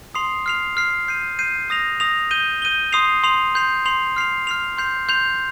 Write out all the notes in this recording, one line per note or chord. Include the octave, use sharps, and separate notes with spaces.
C6 D#6 C7 F7
F6 C7 F7
F6 C7 F7
G6 C7 D#7
G6 C7 D#7
D#6 A#6 F7
D#6 A#6 F7
G6 D#7 G7
G6 D#7 G7
C6 D#6 C7 F7
C6 D#6 C7 F7
C6 G6 C7 F7
C6 G6 C7 F7
F6 C7 F7
F6 C7 F7
C6 G6 C7 F7
C6 G6 C7 F7